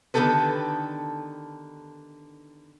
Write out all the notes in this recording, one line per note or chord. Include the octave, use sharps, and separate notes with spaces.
D3 D#3 B3 G4 A4 B4